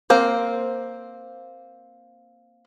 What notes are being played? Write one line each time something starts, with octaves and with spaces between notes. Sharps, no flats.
A#3 C4 C5